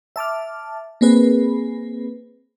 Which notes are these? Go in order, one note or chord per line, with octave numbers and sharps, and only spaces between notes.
E5 A5 D6 F6
A#3 C4 G#4 B4